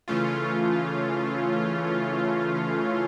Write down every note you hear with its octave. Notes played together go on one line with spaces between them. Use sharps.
C#3 E3 A3 C#4 F4